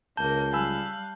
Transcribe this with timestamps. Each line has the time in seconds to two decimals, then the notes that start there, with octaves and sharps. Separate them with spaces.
0.17 C#2 C#3 A#3 A5 G6 G7
0.53 G3 F5 G#5 B5 E6 F#6